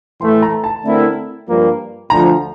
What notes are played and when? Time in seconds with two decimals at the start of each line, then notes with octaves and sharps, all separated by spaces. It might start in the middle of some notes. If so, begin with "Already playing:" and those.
0.21 A2 E3 A3 C6
0.42 A#5
0.64 A5
0.84 D3 A3 C4 E4 A#4
1.47 G2 F3 A#3
2.10 D2 D3 F3 A#5